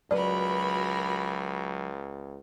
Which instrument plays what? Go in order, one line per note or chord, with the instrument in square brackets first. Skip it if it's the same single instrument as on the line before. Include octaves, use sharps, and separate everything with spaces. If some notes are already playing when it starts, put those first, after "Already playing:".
[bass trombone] C#2 [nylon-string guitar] F#3 B4 [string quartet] F#4 A#4 B5 [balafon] D5